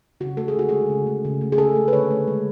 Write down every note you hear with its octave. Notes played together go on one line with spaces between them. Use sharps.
C#3 F#4
A3 A4
G#4
D3 F#4
G#3 G#4
C#3
A3
C#3
A3
G#4
C#3 A4
A3
B4
D3 C#5
A3
G#3